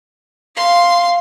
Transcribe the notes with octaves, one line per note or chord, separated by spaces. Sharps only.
F5 C6